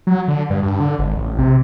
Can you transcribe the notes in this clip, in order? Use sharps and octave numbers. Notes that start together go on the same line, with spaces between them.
F#3
D3
G2
G2
D3
G#1
A1
C3